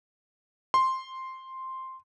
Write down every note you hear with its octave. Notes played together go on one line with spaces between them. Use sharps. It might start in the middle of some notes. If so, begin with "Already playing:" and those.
C6